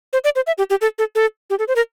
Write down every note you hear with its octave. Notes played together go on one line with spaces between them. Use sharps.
C5
D5
C5
E5
G4
G4
A4
A4
A4
G4
A4
C5
A#4